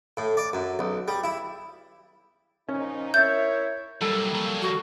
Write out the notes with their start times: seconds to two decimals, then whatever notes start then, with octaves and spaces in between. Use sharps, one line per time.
0.17 A2
0.37 D5
0.53 F#2
0.79 B1
1.08 G3
1.24 E4
2.69 A#2 F3 C#4 D#4
3.14 E4 A#4 C#5 E5 E6 G6 A6
4.01 D#2 F#3 G3 A#3 A4
4.35 F3 F#3
4.62 F#4